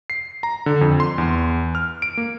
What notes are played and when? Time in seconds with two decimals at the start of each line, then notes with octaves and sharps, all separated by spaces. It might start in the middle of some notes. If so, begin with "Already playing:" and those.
0.10 C7
0.43 A#5
0.66 D3
0.81 F2
1.00 C6
1.18 E2
1.75 F6
2.02 D7
2.17 A#3